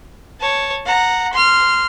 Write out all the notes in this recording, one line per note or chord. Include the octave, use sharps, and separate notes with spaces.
C#5 A5
F#5 A#5
C6 F6